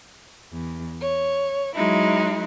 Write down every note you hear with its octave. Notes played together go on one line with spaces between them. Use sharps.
E2
C#5
F#3 G#3 D#4 E4